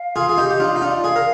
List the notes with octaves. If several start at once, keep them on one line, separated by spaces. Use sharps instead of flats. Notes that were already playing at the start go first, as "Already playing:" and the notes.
Already playing: F5
F4 G#4
G#4
D#4 G4
G4
D4 F4
D#4
D4 F4
G#4 F5
A#4